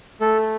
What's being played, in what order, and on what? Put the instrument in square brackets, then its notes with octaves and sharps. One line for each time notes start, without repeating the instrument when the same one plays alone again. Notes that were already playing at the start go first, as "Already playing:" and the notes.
[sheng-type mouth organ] A3 A4